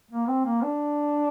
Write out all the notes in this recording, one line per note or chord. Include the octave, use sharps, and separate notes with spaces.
A#3
C4
A#3
D4